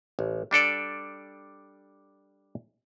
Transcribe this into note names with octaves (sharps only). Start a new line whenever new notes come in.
A1
G3 D4 A4 D5